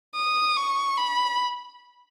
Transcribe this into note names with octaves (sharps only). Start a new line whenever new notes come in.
D#6
C#6
B5